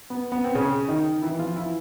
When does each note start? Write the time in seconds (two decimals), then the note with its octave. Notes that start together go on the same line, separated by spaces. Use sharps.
0.10 B3
0.32 B3
0.44 C4
0.55 C#3 C#4
0.88 D#3 D#4
1.22 E3 E4
1.39 F3 F4
1.56 E3 E4